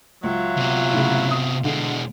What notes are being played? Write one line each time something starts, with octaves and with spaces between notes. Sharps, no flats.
C#2 F#3 F4 E5
C3 B3
A2 C#3
D#6
B2 D3 G#3